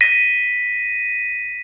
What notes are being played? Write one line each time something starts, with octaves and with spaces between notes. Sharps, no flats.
A#6 B6 D#7